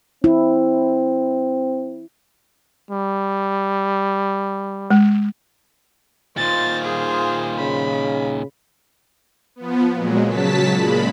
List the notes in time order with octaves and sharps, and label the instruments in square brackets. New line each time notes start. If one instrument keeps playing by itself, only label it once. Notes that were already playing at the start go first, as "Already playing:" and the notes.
[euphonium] C4 [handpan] E4
[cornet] G3
[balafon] G#3
[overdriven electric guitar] A#2 D#3 [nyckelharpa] F4 C5 [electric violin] A6
[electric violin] G#4
[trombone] C#3 [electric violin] B5
[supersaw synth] F3 B3
A#2 F#3 G#3
C#3 F#3 A5 B6
A#2 G#3 B5